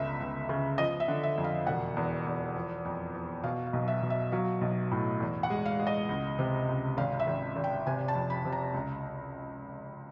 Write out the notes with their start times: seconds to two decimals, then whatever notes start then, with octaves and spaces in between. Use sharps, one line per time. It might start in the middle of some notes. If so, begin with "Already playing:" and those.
Already playing: G1 C#2 E5
0.20 C#2
0.49 C#3
0.78 F3 D#5
1.00 E5
1.08 D3
1.23 E5
1.38 F2
1.44 F5
1.67 E1 F#5
1.97 E2
2.27 E2
2.56 F3
2.85 F2
3.15 F3
3.44 B2 F5
3.67 F5
3.73 B1
3.88 E5
4.02 B2
4.10 E5
4.32 F#3 F5
4.61 B1
4.91 A2
5.20 E2
5.43 F#5
5.50 G#3
5.66 F5
5.79 G#3
5.87 D#5
6.09 C#2
6.39 C3
6.68 C#2
6.97 G#1 F5
7.19 E5
7.27 G#1
7.56 G#1
7.64 G5
7.87 C3 G#5
8.08 A5
8.15 F2
8.30 B5
8.45 C3
8.52 A#5
8.74 C#2